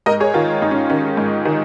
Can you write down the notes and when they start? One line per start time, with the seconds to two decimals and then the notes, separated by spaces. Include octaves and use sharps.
0.06 G#2 A#4 D#5
0.20 G#4 C#5
0.34 D#3 F4 A#4
0.62 G#2 D#4
0.71 C#4
0.90 D#3 C#4
1.17 G#2
1.45 D#3